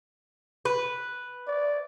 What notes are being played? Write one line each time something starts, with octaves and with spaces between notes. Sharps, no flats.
B4
D5